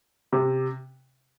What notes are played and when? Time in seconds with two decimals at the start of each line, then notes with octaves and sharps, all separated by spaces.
0.33 C3